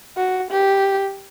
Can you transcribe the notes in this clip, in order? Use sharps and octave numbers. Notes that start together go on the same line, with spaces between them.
F#4
G4